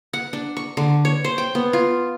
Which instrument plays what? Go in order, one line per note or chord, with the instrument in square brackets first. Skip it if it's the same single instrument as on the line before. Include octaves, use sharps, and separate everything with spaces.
[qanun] F#5
D4
C#6
D3
C#5
C5
G5
B3
F4